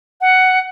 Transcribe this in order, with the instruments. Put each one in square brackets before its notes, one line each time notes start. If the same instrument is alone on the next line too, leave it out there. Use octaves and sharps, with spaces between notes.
[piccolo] F#5